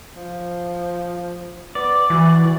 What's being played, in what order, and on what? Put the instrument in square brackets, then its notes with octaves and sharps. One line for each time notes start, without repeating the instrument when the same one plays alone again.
[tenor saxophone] F3
[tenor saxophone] B3 [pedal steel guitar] D5
[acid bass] E3 [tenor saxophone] F#4